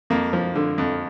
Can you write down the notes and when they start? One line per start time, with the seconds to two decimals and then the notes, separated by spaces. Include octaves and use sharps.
0.10 F2 A#3
0.33 F3
0.55 D3
0.78 F2